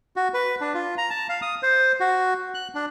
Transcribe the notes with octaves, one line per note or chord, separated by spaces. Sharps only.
F#4
B4
D4
F4
A#5
A5
F5
D#6
C5
F#4
F#6
D4